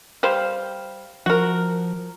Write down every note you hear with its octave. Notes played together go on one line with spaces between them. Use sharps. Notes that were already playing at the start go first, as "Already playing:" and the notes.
G3 C5 F5
F3 F#4 A#4